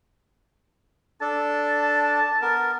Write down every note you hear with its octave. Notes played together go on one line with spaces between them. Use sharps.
D4 A4 A5
B3 A#4